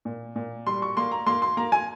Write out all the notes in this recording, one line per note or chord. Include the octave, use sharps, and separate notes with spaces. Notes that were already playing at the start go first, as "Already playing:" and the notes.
A#2
A#2
G3 C6
C#6
A#3 C6
A#5
A#3 C6
C6
A#3 A#5
G#5